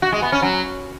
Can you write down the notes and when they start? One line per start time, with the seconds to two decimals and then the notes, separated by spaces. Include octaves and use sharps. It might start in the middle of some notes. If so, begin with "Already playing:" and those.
0.02 F#4
0.12 G#3
0.22 B3
0.32 C#4
0.42 F#3